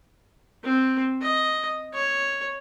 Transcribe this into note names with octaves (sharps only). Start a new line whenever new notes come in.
C4
D#5
C#5